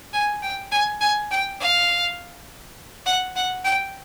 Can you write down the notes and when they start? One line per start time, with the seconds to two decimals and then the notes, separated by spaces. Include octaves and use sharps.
0.13 G#5
0.42 G5
0.71 G#5
1.01 G#5
1.31 G5
1.60 F5
3.06 F#5
3.36 F#5
3.65 G5